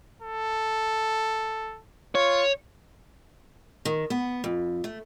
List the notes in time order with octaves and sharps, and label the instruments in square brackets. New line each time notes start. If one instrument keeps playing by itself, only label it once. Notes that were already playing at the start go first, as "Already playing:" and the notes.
[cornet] A4
[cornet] F4 [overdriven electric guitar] C#5
[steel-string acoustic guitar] D#3
B3
F2
A3